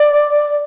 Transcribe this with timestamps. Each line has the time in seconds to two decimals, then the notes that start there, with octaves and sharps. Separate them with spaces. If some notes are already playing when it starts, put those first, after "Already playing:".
Already playing: D5